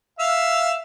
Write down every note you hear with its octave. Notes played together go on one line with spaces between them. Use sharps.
E5 F5